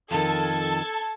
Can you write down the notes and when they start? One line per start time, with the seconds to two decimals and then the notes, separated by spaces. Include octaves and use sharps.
0.11 F2 D#3 A4 A5 G#6 A6